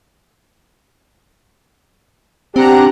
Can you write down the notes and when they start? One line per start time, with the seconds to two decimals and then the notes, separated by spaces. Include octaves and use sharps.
2.56 C4 D4 G4 F#5 A#5